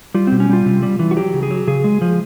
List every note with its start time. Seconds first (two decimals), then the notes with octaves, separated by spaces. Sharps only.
0.14 G3 F4
0.27 B2 C4
0.40 C#4
0.49 G3 F4
0.66 C3
0.83 G3
0.99 E3
1.11 F#4
1.17 F#3 G4
1.33 C#3
1.43 G#4
1.51 F#3
1.67 C#3 G#4
1.84 G#3
2.01 F3